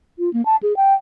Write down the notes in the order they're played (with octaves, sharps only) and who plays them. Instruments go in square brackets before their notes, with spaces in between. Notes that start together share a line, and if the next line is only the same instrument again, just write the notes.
[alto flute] F4
A#3
A5
G#4
G5